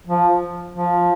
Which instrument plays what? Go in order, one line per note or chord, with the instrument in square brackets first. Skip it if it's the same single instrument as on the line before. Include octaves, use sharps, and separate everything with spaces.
[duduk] F3
F3